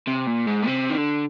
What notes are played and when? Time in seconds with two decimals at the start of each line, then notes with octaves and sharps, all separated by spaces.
0.08 C3
0.27 A#2
0.47 G#2
0.63 A#2
0.67 C3
0.90 D#3
0.97 D3